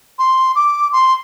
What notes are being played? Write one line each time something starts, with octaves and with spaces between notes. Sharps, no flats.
C6
D6
C6